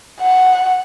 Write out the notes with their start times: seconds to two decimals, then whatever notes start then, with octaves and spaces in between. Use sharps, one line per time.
0.20 F#5